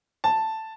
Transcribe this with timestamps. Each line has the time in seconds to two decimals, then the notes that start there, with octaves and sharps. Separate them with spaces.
0.24 A5